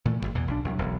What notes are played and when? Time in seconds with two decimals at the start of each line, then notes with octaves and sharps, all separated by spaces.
0.05 A#2 E3 A3
0.20 G#1 E2 G3
0.35 E2 B2 E3
0.48 B1 F3 D4
0.64 C2 C3 F#3
0.79 E1 B1